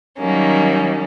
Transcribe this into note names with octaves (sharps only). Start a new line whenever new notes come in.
D#3 F#3 G3 A#3 C#4